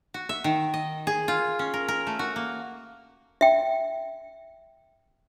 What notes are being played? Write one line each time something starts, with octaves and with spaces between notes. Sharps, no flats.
F#4
E5
D#3
D#5
G#4
F4
C#4
A#4
A#4
A3
F#4
A#3
E5 G5